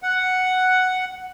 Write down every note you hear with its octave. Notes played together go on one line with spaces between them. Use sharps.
F#5